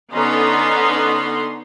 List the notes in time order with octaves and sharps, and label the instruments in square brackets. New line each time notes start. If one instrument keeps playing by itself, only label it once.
[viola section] D3 B3 C#4 D#4 A#5 C6